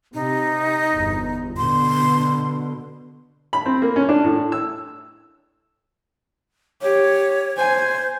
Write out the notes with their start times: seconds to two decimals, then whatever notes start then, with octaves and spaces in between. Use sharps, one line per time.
0.14 C3 D#4
0.92 G1 E2
1.57 B2 D3 C6
3.53 B5
3.66 C4
3.82 A#3
3.96 C#4
4.09 D4
4.24 A2
4.52 E6
6.82 G4 C#5
7.57 C5 G#5